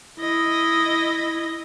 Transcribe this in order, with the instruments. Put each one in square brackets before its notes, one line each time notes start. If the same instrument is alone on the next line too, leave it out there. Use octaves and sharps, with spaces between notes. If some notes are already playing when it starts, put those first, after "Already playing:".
[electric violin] E4 D#5